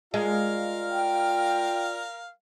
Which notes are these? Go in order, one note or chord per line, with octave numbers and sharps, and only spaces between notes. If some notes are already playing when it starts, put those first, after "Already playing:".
G#3 F4 A#4 D5 F5
G5